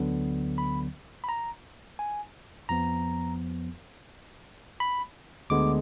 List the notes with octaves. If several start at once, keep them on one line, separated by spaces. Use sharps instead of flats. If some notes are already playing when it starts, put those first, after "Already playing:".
Already playing: D2 D3 F#3 B3
B5
B5
A#5
G#5
F2 F3 B3 A#5
B5
D2 D3 G#3 B3 D6